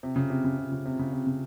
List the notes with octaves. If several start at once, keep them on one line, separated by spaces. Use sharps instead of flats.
C3
C#3
C3
C#3
C3
C#3
C3
C#3
C3
C#3